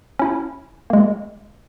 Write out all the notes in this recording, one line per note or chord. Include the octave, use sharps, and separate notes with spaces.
C#4 E4
G#3 A#3